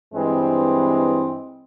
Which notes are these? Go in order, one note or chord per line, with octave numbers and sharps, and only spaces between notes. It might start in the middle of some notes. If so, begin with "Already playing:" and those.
G2 E3 G#3 C4